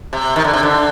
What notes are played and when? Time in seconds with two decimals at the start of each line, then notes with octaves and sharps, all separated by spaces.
0.13 C3
0.36 D#3
0.44 D3
0.53 C3
0.63 D3